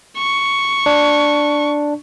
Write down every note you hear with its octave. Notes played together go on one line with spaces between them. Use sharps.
C#6
D4